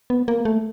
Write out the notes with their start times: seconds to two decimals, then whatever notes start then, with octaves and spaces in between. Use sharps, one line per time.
0.10 B3
0.28 A#3
0.45 A3